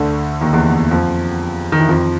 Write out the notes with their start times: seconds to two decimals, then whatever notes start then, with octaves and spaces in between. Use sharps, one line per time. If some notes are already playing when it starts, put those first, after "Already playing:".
Already playing: D2 D3
0.41 D#2 D#3
0.53 E2 E3
0.91 F2 F3
1.72 D#3
1.80 E3
1.89 F2 F3